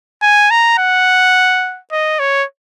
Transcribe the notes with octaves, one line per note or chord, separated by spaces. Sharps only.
G#5
A#5
F#5
D#5
C#5